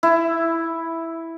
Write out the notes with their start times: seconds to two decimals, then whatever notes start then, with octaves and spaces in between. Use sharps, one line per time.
0.03 E4